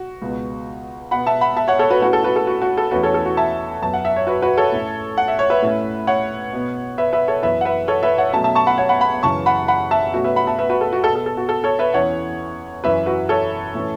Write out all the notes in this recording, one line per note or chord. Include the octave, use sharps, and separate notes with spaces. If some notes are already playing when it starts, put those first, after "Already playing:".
Already playing: F#4
C#2 B2 B3
B2 B3 F#5 B5
E5 A5
F#5 B5
E5 A5
C#5 F#5
A4 C#5
F#4 B4
A2 A3 C#4 F#4 B4
A4
F#4 B4
A4
F#4
F#4
A4
E2 E3 A3 C#4 F#4 B4
A4 C#5
A4
F#4
E5 A5
F#2 F#3 B3 A5
F#5
E5
C#5
F#4 B4
F#4 B4
A4 C#5
A2 A3 C#4
F#5
E5
C#5
B4 E5
A2 A3 C#4
C#5 F#5
B2 B3
B4 E5
B4 E5
A4 C#5
F#2 E3 B3 B4 E5
F#5
B4 E5
A4 C#5
B4 E5
C#5 F#5
B2 F#3 A3 C#4 E5 A5
E5 A5
A5 C#6
F#5 B5
C#5 F#5
F#5 B5
F#5 B5
F#2 C#3 E3 C#4 A5 C#6
F#5 B5
F#5 B5
E5 A5
B2 A3 C#4 F#4
B4 E5
F#5 B5
E5 A5
B4 E5
F#4 B4
A4
F#4
B2 B3 A4
A4
A4
F#4
A4
A4 C#5
B4 E5
E2 E3 C#4 C#5 F#5
F#2 E3 C#4 B4 E5
F#4 B4
A4 C#5
A2 E3 C#4